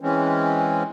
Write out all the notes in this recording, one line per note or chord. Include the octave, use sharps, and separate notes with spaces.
E3 G#3 C4 C#4